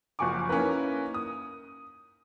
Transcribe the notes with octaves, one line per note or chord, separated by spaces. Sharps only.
F#1 F3 F#4 G#5 C#6 D6
A#3 C#4 D#4 E4 A#4 B4
D#6